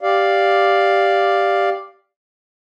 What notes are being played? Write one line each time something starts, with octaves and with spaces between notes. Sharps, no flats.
G4 D5 F5